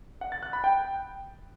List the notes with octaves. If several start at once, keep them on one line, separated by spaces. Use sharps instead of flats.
F#5
A6
F#6
B5
G5